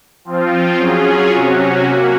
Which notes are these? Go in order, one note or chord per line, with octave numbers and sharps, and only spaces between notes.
F3 C4 F4
F#3 C#4 F4 G#4
C3 F#3 C#4 F#4
F#3 A#3 C#4 F#4